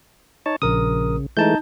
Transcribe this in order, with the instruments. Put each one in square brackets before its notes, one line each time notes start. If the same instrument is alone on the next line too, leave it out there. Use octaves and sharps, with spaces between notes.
[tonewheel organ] D#4 C#5 A5
[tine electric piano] A#1 A#4 D#6 [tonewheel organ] C#3
[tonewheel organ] E3 G#3 A3 [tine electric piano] D#4 A5 G6